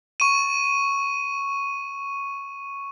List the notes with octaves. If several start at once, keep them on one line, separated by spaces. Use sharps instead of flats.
C#6 D#7